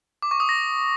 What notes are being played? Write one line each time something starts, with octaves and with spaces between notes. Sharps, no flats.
D6
C#6
D#6
A#6